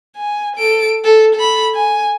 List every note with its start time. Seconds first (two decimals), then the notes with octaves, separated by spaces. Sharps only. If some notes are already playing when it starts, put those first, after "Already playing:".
0.17 G#5
0.57 A4 D7
1.04 A4
1.35 A4 B5
1.75 G#5